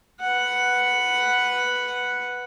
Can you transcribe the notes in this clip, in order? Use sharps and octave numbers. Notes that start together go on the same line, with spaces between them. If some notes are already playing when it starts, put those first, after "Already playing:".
B4 F#5